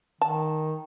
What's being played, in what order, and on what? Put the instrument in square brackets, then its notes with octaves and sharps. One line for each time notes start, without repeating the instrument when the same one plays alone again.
[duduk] D#3 [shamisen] A5